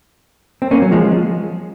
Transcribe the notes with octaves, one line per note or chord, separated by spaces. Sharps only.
C4
A#3 C#4
F#3
F3 G#3